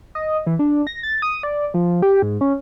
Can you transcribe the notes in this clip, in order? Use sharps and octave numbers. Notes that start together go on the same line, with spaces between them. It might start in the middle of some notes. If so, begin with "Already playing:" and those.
D#5
E3
D4
A#6
A6
D#6
D5
F3
G4
G#2
C#4